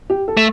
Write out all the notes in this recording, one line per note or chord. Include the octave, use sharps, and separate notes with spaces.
G4
A4
A3